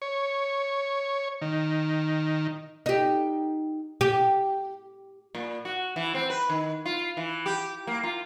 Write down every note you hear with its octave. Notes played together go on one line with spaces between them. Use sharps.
C#5
D#3
D#4 G4
G4
A#2
F#4
E3
C4
B4
D#3
F4
E3
G4
A#3
F4